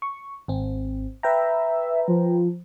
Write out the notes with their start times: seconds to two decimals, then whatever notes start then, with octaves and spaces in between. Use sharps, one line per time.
0.02 C#6
0.48 G#1 C4
1.23 B4 E5 G5 A#5
2.08 F3